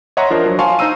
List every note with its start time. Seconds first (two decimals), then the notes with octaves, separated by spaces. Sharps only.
0.17 C#5 D#5 E5 F#5 A#5 C6
0.30 F3 D4 A#4 C5
0.46 F#3
0.59 F5 G#5 A5 C6 C#6 F6
0.79 D#4 C5 A#5 E6 D#7